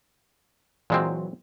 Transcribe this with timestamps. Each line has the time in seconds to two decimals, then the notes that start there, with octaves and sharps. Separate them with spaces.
0.90 A#2 E3 F#3 G#3 C4